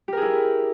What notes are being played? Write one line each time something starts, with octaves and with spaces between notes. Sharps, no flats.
E4 G4 G#4 A#4